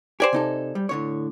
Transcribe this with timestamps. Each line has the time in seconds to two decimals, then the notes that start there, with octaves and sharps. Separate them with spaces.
0.20 G4 C5 D5 G#5
0.33 C3 D#4 A4
0.75 G3
0.89 A2 D3 C#5